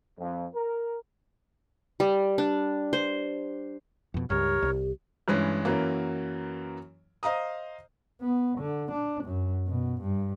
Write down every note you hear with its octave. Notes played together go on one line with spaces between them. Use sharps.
F2
A#4
G3
D4
C5
F2 B2
C#2 G2 G4 A#4 C#5
C2
G2 E3 G#3 C#4
F#2 E3 F#3 A#3
C5 D#5 F5 A#5 D#6
B3
D3
D4
F#2
B2
G2